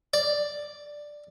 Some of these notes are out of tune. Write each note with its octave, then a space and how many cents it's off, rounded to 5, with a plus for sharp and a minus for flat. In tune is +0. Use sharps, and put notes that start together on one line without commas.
D5 +5